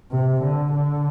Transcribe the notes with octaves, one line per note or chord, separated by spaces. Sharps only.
C3
D3
D3